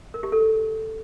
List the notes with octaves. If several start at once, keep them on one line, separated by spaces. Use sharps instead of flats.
A#4
G4
A4